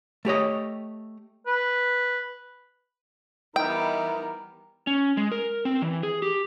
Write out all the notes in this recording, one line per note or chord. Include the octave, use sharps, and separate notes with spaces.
A3 G4 C#5 D#5
B4
E3 G3 B3 D#4 E4 A#4 G5
C#4
G#3
A#4
C4
E3
G#4
G4